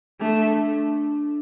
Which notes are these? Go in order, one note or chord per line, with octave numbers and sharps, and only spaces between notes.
A3 D4